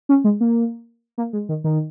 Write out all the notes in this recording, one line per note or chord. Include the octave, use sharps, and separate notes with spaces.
C#4
G#3
A#3
A#3
G#3
D#3
D#3